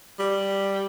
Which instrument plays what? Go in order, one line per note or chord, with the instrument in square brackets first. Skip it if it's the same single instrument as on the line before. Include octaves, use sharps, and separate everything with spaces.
[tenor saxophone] G3